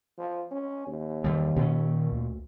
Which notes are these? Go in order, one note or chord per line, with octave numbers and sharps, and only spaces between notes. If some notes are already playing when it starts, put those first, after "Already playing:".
F3
C#4
D#2
E2 D#3 G3
A#2 C#4
D2